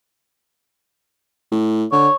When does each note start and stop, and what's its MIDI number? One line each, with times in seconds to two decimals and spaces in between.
1.52 1.85 45
1.92 2.08 50
1.92 2.15 73